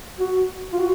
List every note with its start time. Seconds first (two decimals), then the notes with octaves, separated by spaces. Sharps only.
0.19 F#4
0.73 F4
0.79 F#4